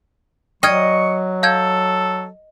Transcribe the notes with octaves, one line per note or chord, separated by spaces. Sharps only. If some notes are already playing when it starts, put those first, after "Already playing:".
F#3 D#5 G5 C#6 F6 G#6
A4 F5 G6 G#6